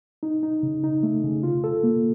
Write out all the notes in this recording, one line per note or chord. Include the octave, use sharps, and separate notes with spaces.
D#4
D#4
C#3
D#4
A3
C#3
F4
A4
A#3